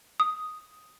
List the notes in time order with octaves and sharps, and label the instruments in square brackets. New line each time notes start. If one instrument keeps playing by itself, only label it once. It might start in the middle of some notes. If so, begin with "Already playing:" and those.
[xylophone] D#6